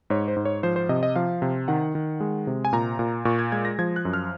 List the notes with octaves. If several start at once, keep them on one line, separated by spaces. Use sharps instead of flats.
G#2 C#5
C5
G#2
C#5
F3 C5
C5
C3 D#5
D#5
F3 F5
C3
D#3 F#5
D#3
G#3
C3
G#5
A#2 A#5
A#2
A#2 C#6
G#6
G#3 G#6
A#6
F3 G#6
F#6
F#2
F6